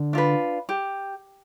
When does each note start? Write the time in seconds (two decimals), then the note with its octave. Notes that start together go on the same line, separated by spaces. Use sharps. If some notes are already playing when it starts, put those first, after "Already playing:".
Already playing: D3
0.13 D4 F4 B4
0.69 G4